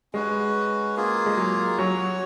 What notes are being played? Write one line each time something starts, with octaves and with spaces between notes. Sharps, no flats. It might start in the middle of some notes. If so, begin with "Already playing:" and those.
G#3 C#4 F#4 B4
A#3 F4 G#4
G#3
F#3
F#3 C#4 F#4 C#5